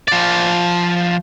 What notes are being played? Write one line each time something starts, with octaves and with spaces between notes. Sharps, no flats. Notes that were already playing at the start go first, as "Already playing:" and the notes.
F3 D5